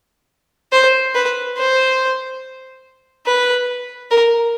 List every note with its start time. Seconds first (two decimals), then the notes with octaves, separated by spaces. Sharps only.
0.72 C5
1.14 B4
1.56 C5
3.26 B4
4.11 A#4